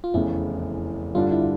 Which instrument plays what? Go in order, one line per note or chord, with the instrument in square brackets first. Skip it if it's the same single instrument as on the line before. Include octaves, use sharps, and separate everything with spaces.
[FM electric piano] F4
[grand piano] F1 E2 C#3 [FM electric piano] E4
[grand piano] G2 D3 G3 D4 [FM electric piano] F4
[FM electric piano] E4